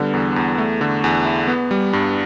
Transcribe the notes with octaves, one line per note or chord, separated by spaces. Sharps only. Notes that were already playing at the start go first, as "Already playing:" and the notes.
Already playing: D3 G3 B3
E2
E2
A3
D3
E2
E4
B3
G3
G2